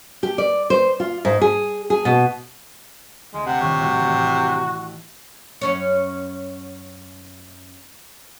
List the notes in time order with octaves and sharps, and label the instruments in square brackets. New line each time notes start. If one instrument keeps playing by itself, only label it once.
[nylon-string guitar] G4
D5
C5
F4
G#2
G#4
G#4
B2
[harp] D2 [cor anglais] G#3
[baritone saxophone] C3 [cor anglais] F#5
[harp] D#1 G2 F#6 [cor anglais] C#5
[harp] A1 [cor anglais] F#4
[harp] A1
[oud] F#2 C#4 C#5